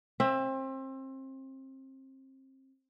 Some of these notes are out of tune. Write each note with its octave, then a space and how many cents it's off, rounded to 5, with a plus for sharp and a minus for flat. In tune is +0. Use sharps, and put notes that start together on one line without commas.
C4 +30 E5 +0